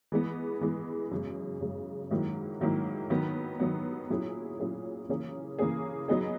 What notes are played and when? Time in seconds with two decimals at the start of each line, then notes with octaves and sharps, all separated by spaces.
0.12 E3 G#3 B3
0.61 E3 G#3 B3
1.11 F#2 C#3 G#3
1.61 F#2 C#3 G#3
2.11 G#2 D#3 F#3 A#3 E4
2.60 G#2 D#3 F#3 A#3 E4
3.10 D#3 F#3 B3
3.60 D#3 F#3 B3
4.09 A#2 F#3 C#4 E4 G#4
4.59 A#2 F#3 C#4 E4 G#4
5.09 C#3 E3 A#3 C#4 G#4
5.59 C#3 E3 A#3 C#4 G#4
6.08 F#3 B3 D#4 G#4